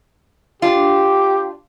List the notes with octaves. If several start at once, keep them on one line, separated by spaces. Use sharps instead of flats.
D4 F4 G4